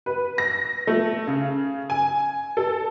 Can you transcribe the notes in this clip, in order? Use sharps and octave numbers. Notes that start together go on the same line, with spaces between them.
B4
A#6
A3
C#3
G#5
A4